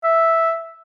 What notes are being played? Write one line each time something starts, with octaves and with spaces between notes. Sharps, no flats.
E5